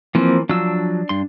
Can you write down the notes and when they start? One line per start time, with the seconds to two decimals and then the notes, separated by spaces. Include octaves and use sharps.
0.15 E3 F3 A#3 C4
0.49 F3 F#3 D4 E6
1.09 G2 C6